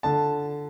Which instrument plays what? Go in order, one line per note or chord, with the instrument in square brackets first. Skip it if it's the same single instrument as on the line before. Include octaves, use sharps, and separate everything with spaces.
[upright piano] D3 [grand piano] A5